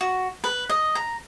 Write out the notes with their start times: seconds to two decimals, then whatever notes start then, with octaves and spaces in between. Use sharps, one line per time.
0.01 F#4
0.44 B4
0.69 D#5
0.95 A#5